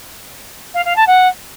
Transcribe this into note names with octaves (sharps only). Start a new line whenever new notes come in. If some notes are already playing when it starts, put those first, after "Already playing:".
F5
F5
A5
F#5